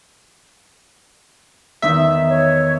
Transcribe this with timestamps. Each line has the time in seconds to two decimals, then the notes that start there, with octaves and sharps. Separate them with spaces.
1.82 E2 D#3 D#4 E5
2.29 C#5